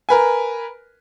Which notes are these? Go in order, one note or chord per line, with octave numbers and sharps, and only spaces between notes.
A#4 B4 G#5